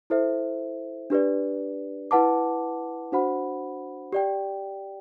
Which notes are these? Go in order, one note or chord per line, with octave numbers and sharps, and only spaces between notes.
E4 A4 C5 E5
D4 G4 B4 D5
E4 B4 F#5 A5 D6
D4 F#4 C5 F#5 B5
G4 D5 G5